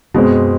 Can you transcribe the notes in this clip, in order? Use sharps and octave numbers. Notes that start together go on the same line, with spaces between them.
F#2 B2 G#3 C4